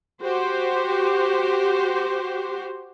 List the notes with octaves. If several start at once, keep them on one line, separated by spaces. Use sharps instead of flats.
F#4 G4 C5